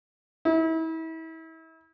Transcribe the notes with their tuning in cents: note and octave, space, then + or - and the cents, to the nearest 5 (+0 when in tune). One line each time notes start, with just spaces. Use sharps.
E4 -35